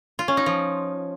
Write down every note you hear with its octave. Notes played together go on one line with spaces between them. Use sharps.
F4
C#4
D#4
F3